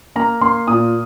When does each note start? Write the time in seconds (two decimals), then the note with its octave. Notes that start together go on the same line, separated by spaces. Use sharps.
0.16 A#3 A#5
0.41 A#3 C6
0.68 A#2 D#6